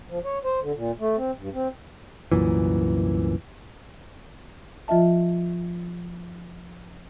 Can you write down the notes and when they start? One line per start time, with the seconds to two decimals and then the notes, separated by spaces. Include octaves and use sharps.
0.09 F3
0.25 C#5
0.45 C5
0.62 D3
0.75 A#2
0.99 A3
1.17 C4
1.38 G2
1.54 C4
2.32 C2 F#2 A#2 E3
4.88 F3 F4 D#5 E5 A5